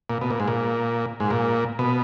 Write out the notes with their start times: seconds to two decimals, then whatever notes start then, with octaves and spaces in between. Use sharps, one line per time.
0.10 A#2
0.21 B2
0.30 A#2
0.40 G#2
0.48 A#2
1.20 G#2
1.31 A#2
1.79 B2